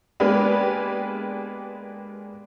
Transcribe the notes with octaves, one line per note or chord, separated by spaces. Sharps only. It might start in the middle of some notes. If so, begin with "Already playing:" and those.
G#3 A#3 B3 D4 G4 B4